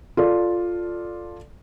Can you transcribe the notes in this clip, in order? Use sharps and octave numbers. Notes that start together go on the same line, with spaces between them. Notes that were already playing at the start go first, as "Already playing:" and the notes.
F4 A4 D5